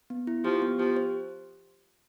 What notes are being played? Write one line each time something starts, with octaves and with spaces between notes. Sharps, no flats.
B3
E4
F3 G4
B3
F3 G4
C5